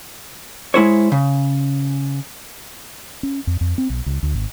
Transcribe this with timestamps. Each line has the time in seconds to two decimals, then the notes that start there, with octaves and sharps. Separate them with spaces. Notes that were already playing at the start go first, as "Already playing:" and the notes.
0.74 G#3 E4 C5 C#5
1.12 C#3
3.23 C#4
3.47 F2
3.61 F2
3.78 C4
3.90 B1
4.06 C#2
4.23 D2
4.34 G#1